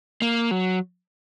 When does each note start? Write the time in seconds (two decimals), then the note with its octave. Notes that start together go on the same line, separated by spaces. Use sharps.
0.22 A#3
0.51 F#3